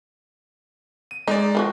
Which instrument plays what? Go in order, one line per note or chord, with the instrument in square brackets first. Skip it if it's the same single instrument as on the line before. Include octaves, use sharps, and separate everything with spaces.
[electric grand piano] D#7
[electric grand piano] G#3 D5 [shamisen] D#4
[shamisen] D#3 F3 F#4